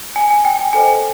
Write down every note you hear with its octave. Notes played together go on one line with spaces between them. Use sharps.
G#5
G#5
G5
G#5
A4 C5 D#5 G#5